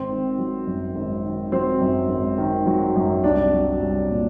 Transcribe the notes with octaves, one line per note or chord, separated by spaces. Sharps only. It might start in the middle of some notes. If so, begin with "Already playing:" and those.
Already playing: G#1 C4
D#3
F#3
F#2
G#1
D#3
F#3 C4
F#2
G#1
D#3
F#3
F#2
C2 D4
F#3
C2
A#2